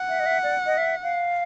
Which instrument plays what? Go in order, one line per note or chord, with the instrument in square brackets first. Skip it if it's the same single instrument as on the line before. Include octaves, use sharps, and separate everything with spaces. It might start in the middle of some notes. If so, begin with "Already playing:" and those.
Already playing: [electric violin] F#5
[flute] E5
D#5
E5
D5
D#5
E5
F5